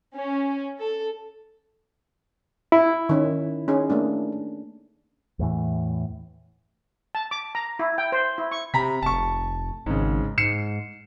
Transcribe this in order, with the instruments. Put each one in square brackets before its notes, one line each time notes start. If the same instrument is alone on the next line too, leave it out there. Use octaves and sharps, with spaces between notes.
[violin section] C#4
A4
[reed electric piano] E4
[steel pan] D#3 C#4
C#4 D#4 G#4
A3 A#3 D4
[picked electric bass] E2 A2 E3
[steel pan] A5
D6
A#5
E4
G5
C5
E4
C#6
[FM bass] C3 [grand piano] A#5 B5 B6
[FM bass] F1 [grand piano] A5 C#6
[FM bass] G#1 [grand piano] G#2 C#3
[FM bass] G#2 [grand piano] C7 C#7 E7